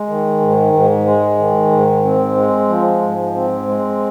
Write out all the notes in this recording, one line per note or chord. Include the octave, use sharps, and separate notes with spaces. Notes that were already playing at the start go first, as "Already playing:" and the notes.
Already playing: G#3
D#3
G#2
G#2
G#3
D#3
G#2
C4
G#3
F3
G#2
C4
G#3